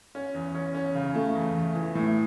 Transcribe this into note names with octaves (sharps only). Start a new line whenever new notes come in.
C#4
E2
C#4
C#4
C#3
A3
E2
E2
E3
A2